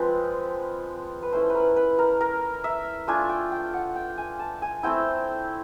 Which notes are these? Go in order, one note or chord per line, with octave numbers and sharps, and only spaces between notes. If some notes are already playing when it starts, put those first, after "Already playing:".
Already playing: F3 G#3 C4 B4
B4
A3 C#4 E4 C5
A#4 B4
B4
A#4
A#4
E5
A3 D4 F4 G#5
G5
G5
F#5
G5
G#5
A5
G#5
A3 C4 E4 G5